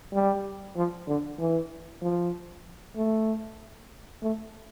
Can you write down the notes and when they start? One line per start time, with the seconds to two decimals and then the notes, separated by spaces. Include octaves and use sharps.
0.12 G3
0.76 F3
1.07 D3
1.39 E3
2.01 F3
2.96 A3
4.22 A3